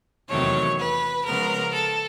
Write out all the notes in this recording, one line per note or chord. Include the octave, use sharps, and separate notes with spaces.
E2 C3 D#3 F#3 A3 C#5
B4
C#3 F3 G#3 B3 A#4
A4